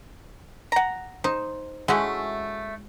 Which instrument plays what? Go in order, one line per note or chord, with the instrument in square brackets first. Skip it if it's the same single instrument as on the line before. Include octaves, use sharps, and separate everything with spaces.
[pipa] F#5 A#5
[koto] D#4 [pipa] C5
[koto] G#3 F#4 [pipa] A3 C#4 E4